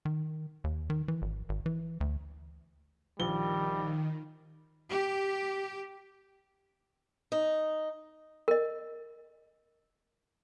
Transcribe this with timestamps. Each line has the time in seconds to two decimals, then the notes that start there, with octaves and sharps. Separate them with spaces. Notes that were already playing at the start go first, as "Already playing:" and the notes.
0.05 D#3
0.64 D#2
0.90 D#3
1.08 E3
1.22 G#1
1.49 G#1
1.66 E3
2.01 D2
3.19 A#1 D#3 G3 G7
4.89 G4
7.32 D#4
8.48 A#4 D#5